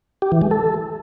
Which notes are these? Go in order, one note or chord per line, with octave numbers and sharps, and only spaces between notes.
G4
E3
G#3
A4